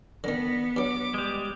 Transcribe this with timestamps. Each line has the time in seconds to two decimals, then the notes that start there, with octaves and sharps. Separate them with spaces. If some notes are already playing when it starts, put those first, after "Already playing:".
0.24 D3 D#3 B3 A#6
0.76 G2 F#3 D6
1.14 G3 G#3